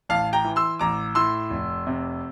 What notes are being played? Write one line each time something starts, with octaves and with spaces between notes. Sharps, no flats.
A1 F5 A5
G5 A#5
E3
C6 E6
A1 A#5 D6
A2 C6 E6
F1
C3